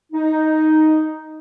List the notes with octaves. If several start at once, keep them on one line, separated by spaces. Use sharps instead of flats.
D#4